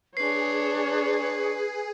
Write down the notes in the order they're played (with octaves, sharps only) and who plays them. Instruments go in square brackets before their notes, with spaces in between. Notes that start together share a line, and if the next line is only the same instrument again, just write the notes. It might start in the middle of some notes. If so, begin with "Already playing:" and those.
[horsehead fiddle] D4 C#5 [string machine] G#4 [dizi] B4 [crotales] C7